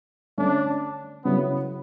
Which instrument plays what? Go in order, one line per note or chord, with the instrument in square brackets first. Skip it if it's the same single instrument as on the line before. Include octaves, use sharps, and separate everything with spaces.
[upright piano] D3 A3 C#4 [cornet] D4
[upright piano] C#3 F#3 C#4 E4 [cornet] B3